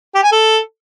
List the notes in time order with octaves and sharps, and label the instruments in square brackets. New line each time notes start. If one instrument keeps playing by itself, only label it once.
[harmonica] G4
G#5
A4